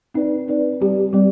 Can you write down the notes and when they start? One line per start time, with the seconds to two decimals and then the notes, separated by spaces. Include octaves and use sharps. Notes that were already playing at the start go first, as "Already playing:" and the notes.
0.14 C4 D#4 B4 D5
0.48 C4 D#4 B4 D5
0.81 G3 C4 G4 D5
1.13 G3 C4 G4 D5